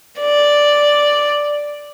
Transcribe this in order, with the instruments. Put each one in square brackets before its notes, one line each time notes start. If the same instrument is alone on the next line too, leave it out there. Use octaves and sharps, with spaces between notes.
[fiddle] D5